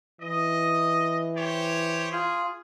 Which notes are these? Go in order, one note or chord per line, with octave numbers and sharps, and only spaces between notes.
E3 D#5
G4 C5 C#5
F4 G#4